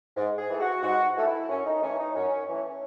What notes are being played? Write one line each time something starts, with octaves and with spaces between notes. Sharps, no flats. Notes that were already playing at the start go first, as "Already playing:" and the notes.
G#2
G#4
E3 A3
F#4
G#2 F#4
E3 A3
E4
F#2 C#4
D#4
E3 A3 C#4
D#4
F#2 C#4
E3 A3 C#4